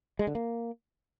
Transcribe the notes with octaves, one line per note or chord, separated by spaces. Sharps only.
G#3
D3
A#3